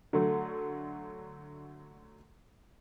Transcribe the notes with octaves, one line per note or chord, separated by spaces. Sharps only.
D3 F#3 A3